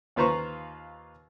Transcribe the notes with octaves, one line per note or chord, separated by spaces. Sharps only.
D#2 F4 B4 C5 A#5 C#6